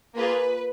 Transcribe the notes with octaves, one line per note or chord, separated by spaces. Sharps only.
A#3 F4 G#4 B4